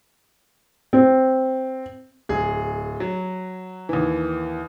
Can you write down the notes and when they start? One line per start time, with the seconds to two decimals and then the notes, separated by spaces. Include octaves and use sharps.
0.93 C4
2.29 D1 G#4
3.00 F#3
3.89 D#2 E3